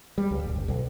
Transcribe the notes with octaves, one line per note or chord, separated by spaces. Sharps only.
G3
C#2
D1
G1
B1